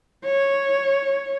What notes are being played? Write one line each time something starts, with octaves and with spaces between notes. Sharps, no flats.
C#5